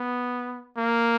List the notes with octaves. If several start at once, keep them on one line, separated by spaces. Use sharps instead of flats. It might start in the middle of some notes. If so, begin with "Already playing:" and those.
Already playing: B3
A#3